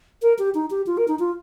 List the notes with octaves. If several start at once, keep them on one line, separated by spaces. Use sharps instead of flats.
A#4
G4
D#4
G4
F4
A#4
D#4
F4